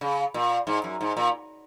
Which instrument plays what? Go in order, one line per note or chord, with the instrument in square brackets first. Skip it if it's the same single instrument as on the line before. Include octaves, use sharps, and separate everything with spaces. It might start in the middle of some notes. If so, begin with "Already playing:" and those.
[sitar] C#3
A#2
G#2
F#2
G#2
A#2